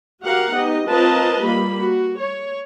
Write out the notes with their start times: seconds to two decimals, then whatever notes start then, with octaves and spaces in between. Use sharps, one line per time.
0.24 F#4 G4 A#4 F5 F#5
0.53 B3 D#4 G4 D#5
0.88 C4 F4 A#4 B4 D#5 A5
1.42 G3 A#3 F4 B5
1.80 F#4
2.17 C#5